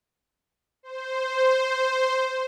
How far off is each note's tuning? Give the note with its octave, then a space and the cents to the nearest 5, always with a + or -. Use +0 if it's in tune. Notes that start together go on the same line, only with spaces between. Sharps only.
C5 -5